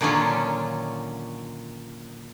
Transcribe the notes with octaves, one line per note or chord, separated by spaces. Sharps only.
A#2 D3 D#3 F#3 C#4 F4